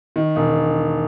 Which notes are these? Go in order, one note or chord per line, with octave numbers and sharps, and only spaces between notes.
D#3
E1